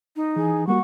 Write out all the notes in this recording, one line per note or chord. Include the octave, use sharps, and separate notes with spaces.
D#4
E3 G#4
G3 A#3 F#4 F#5 C#6